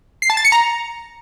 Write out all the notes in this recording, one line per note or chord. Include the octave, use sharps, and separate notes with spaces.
C7
A5
A6
C#7
A#5